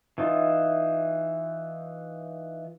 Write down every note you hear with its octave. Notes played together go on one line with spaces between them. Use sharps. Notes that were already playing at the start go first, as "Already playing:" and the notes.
E3 D#4 F4